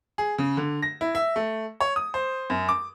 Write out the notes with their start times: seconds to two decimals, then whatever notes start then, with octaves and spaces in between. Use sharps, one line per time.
0.18 G#4
0.38 C#3
0.57 D3
0.82 A#6
1.01 E4
1.15 E5
1.36 A3
1.80 C#5
1.96 D#6
2.14 C5
2.50 F#2
2.69 D6